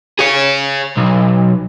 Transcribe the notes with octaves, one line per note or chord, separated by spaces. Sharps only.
G#4 C#5
B1